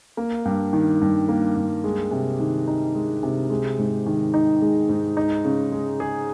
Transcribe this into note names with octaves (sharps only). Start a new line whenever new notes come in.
A#3
G2
D#3
G2
A#3
G2
G#3
C3
D#3
D#4
G#3
C3
G#3
G#2
D#3
D#4
G#3
G#2
D#4
C#3
G#3
G#4